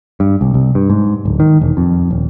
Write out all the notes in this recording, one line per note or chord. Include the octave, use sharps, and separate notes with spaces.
G2
C2
C2
G2
G#2
D1
D#3
E1
F2
D#1